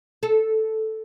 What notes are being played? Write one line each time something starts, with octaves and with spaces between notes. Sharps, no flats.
A4